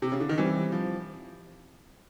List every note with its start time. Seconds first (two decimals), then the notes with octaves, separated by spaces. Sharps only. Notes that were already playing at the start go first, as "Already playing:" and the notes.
0.02 C3
0.12 C#3
0.20 D3
0.29 D#3
0.38 E3 G3 C4 E4 G4
0.72 F3